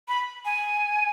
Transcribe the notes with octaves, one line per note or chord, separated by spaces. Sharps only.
B5
G#5